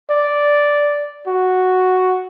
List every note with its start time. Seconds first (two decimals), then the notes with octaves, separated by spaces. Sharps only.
0.10 D5
1.27 F#4